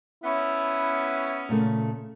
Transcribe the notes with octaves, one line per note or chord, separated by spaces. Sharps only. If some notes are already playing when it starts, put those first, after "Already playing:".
B3 C#4 E4
A#2 C#3 A3